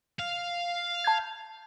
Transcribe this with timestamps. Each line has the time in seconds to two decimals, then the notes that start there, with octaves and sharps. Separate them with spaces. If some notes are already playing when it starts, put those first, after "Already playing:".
0.19 F5
1.04 A5 G6 G#6